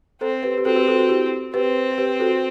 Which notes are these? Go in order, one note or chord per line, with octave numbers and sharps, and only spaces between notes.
C4 A4 C5
G4 B4
G4
C4 F#4 A4
G4 B4
F#4 A4
F#4 A4
E4 G4
C4 G4 B4
C5
G4 B4
F#4 A4